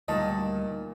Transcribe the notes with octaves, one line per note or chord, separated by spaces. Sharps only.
D2 A#2 D#3 G3 B4 D#5 A5